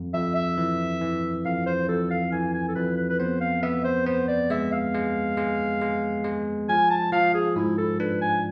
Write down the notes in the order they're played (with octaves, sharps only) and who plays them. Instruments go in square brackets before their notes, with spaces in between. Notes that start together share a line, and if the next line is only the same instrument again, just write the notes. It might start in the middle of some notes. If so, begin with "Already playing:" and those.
Already playing: [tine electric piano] F2
[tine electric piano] F2 [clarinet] E5
[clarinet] E5
[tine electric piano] E3
E3
[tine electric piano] F2 [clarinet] F5
[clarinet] C5
[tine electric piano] F2 [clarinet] A4
[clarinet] F5
[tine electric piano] E3 [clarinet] G#5
[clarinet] G#5
A4
[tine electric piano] F2 [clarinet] B4
[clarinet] B4
B4
[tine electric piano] B3 [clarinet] C5
[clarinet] F5
[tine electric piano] B3 [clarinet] E5
[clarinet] C5
[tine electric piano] B3 [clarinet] C5
[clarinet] D5
[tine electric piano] G#3 [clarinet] E5
[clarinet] F5
[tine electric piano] G#3
G#3
G#3
G#3
[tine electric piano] F3 [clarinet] G#5
[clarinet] A5
[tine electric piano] F3 [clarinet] F5
[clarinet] G#4
[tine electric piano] G#2 [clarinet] E4
[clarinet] A4
[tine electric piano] D4 [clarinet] B4
[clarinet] G#5